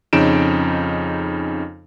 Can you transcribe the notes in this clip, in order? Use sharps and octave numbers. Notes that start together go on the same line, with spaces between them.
F2 C#3 C#4 D#4 D7 E7